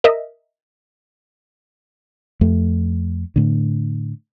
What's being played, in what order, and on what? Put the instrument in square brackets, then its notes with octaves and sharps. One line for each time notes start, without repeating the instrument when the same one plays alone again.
[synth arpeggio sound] A#4 D#5 E5
[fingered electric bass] F2 A3
A2 D3